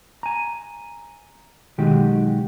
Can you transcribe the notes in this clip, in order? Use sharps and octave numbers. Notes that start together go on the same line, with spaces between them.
G#5 A#5
B1 D#3 G#3 F#4 G4 G5